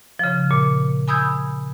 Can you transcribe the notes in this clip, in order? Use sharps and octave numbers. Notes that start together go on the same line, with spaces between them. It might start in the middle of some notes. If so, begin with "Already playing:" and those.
C#3 F3
A#2
G#5 B5 D#6 E6 G6 G#6